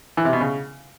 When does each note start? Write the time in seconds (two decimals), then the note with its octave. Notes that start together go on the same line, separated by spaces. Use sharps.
0.17 E3
0.25 C3
0.33 B2
0.41 C#3